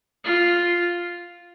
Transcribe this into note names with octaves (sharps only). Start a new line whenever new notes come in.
F4